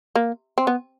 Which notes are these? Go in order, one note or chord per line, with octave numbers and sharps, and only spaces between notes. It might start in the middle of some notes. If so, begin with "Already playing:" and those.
A#3
C4
B3